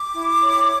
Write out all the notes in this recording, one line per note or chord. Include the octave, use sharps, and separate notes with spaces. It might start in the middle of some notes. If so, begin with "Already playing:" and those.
Already playing: D6
E4
C#5